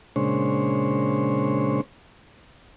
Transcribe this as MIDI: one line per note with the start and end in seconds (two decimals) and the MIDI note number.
0.16 1.81 46
0.16 1.81 49
0.16 1.81 56
0.16 1.81 62
0.16 1.81 72
0.16 1.81 73